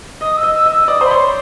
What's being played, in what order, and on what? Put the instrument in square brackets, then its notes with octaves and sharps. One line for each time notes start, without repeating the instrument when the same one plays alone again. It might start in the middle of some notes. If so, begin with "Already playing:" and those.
[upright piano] D#5 [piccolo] D#6
[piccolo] E6
[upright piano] D#5
[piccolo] E6
[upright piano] D#5 [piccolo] E6
[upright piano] D#5
[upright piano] D5 [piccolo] D#6
[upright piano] C5 [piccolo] B5
[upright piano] C#5 [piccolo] C6